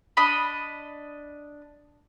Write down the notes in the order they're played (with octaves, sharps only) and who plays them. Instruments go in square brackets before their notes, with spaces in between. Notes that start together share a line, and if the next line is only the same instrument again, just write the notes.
[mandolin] D4 D#5 B5